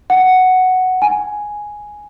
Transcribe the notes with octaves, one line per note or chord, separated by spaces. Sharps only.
F#5
G#5